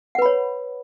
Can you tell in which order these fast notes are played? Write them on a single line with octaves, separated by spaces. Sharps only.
F#5 B4 B5 C#5